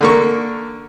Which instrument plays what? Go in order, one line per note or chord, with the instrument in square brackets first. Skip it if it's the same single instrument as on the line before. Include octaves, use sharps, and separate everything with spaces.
[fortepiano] D3 A#3 C#6